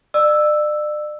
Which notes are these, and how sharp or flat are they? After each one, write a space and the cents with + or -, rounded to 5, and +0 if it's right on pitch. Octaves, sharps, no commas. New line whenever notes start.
D5 +35 E6 +0